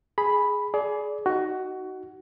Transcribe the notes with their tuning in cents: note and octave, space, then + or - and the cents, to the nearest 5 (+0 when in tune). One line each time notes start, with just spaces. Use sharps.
G#4 +0 B5 +0
G#4 +20 D5 -15
D#4 +0 F#4 +15